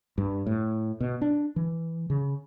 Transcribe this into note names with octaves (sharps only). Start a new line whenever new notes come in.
G2
A2
B2
D4
E3
C#3